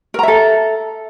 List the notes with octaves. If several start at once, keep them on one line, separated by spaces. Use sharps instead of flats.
A4 A#4 E5 A#5